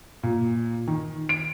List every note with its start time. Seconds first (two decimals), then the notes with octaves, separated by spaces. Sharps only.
0.23 A#2
0.87 D#3
1.29 D7